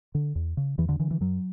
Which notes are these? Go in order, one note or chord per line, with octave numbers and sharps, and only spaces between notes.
D3
E2
C#3
E2 E3
D3
D3 E3
E3
F#2 F#3